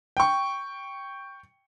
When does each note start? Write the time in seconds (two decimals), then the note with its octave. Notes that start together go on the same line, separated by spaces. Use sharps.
0.17 G5 C#6